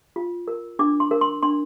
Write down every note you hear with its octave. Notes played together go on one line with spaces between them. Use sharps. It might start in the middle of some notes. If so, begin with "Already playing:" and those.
F4
A#4
D4 D6
C6
A#4
C6
D4 C6